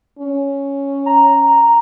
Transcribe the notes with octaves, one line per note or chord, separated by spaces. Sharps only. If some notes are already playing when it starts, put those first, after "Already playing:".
C#4
A#5